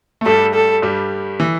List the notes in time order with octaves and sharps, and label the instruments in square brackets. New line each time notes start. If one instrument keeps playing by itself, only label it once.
[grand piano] A3
[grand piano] G2 G3 [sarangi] A4
[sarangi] A4
[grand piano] G2 G3
E3